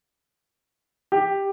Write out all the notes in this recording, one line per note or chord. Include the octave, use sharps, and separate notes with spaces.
G4